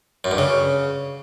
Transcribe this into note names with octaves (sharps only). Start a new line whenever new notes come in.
F#2
G2
C#3